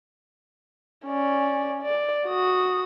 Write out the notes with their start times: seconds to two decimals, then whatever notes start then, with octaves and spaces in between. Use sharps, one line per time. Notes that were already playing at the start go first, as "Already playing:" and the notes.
1.06 C#4 D5
1.83 D5
2.28 F#4 D#6